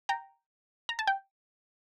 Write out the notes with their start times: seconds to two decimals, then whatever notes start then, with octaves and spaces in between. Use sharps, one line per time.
0.09 G5 A#5
0.89 A#5
0.99 A5
1.07 G5